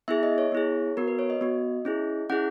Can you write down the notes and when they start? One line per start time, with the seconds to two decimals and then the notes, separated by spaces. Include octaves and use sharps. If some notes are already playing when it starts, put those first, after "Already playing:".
0.08 B3 E4 G#4 E5
0.23 D#5
0.38 C#5
0.52 B3 E4 G#4
0.97 B3 F#4 A#4
1.08 B4
1.19 C#5
1.30 D#5
1.41 B3 F#4
1.85 C#4 E4 G#4
2.29 C#4 E4 G#4 F#5